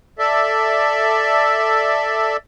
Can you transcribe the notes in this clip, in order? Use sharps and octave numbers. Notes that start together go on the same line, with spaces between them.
A4 D5 E5